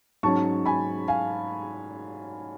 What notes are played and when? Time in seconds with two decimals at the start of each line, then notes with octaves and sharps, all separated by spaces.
0.23 G#2 F#3 C#4 A5 C#6
0.66 G#5 B5
1.08 F5 G#5